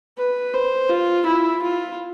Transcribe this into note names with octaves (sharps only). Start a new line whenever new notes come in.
B4
C5
F4
E4
F4